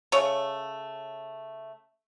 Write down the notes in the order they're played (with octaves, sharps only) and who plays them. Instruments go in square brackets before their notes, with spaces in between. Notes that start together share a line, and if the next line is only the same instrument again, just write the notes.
[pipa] C#3 A3 C#5